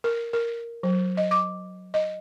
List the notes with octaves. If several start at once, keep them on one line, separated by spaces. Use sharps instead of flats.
A#4
A#4
F#3
D#5
D6
D#5